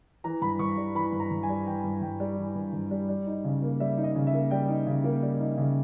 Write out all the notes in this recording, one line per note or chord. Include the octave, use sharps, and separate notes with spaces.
E3 A#5
G2 B5
G2 C#6
G3
E3 B5
G2
A#5
G2
G#5
G3
E3 G5
G2
G2 G5
G3
E3
G2
G2
G3
G3
D#4
C#3
A#3
G3 E5
D#4
D#5
C#3
E5
A#3
G3 G5
D#4
C#3
A#3
G3
D#4
C#3